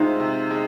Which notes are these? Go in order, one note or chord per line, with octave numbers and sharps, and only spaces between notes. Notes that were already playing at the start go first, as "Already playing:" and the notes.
Already playing: C3 G#3 D#4 F4 C5
C3
G#3